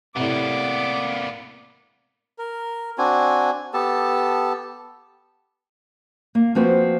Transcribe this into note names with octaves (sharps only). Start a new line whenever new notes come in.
A2 C3 A#3 B3 D5 D6
A#4
C4 D4 F#4 G#5
B3 G4 A4 A5
A#3
F3 A#3 C4 F#4 B4 C5